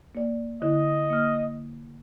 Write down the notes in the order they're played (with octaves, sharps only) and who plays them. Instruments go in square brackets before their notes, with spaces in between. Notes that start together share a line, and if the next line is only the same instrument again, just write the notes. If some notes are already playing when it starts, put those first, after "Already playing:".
[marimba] A#3 D5
[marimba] D3 E4 [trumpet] D#5
[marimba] A#3 F6